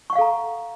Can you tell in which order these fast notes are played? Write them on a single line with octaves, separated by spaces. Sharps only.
C#6 F#5 F5 A4 A#5